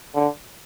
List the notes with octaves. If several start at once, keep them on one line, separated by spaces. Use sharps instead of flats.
D3